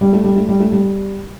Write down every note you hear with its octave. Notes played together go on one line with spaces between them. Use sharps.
G3
A3
G3
A3
G3
A3
G3